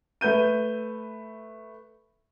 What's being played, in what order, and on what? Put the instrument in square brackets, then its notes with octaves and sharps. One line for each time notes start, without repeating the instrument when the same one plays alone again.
[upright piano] A3 B4 G6 D#7